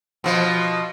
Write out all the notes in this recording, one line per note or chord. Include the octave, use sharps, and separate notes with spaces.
B2 F3